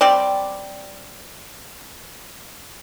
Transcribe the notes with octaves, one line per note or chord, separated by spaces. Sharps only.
G3 C4 D5